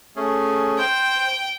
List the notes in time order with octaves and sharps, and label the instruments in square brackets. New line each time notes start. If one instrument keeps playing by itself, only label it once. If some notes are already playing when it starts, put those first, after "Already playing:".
[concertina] A3 C#4 G#4
[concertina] C5 [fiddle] G5